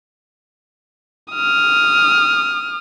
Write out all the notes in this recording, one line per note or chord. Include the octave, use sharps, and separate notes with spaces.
D#6 F6